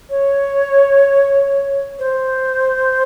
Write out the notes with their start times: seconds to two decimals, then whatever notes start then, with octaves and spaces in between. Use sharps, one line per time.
0.10 C#5
1.99 C5